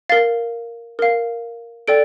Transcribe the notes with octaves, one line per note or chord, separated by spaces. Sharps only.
A#4 F5 A6
A#4 F5
A4 D5 G5 D7